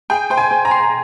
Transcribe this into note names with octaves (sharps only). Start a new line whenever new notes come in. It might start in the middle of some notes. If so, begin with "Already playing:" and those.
G#4 G5
C5 G5
G#5
C5
A#5
C6